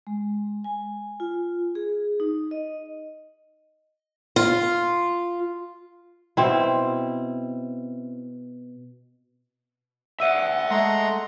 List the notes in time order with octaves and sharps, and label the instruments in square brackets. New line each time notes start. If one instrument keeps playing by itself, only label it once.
[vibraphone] G#3
G#5
F4
G#4
D#4
D#5
[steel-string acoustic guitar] F4
[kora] B2 C4 E4
[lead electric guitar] D5 E5 [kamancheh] F#5 [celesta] E6 D#7
[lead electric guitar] G#3 [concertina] A3 A#5 C6